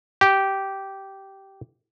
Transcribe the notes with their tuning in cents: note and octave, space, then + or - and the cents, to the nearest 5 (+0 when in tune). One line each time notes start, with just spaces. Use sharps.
G4 -10